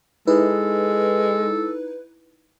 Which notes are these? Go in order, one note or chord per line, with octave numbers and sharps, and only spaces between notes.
G#3 D#4 E4 A4 B4